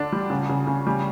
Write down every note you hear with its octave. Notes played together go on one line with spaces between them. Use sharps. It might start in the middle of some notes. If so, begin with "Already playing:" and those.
Already playing: D3 D4
G3
C#3
C#3
C#3
G3